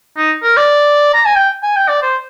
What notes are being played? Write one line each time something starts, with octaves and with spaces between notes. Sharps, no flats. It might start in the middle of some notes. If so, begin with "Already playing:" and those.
D#4
A#4
D5
A#5
G#5
G5
G#5
G5
D5
C5